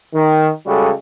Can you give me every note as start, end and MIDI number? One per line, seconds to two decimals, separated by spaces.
0.14 0.48 51
0.66 0.90 49
0.66 0.90 55
0.66 0.90 56
0.66 0.90 66
0.66 0.90 67
0.66 0.90 69